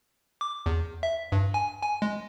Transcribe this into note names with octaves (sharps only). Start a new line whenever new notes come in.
D6
E2
E5
G2
G#5
G#5
G#3